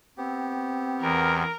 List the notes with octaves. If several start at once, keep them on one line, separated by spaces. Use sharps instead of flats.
B3 C4 G4
E2 A#4